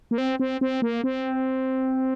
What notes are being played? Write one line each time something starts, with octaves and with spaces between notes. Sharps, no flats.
A#3
C4
C4
C4
A#3
C4